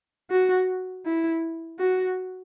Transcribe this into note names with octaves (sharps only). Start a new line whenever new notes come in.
F#4
E4
F#4